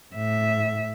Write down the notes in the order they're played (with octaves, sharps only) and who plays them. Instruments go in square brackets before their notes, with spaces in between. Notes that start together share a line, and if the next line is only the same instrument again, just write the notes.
[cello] A2 E5